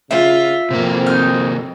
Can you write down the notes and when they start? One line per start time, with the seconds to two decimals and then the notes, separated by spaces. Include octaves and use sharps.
0.11 C#3 F4 E5
0.71 F2 C3 A#3 C4
1.07 D#4 F6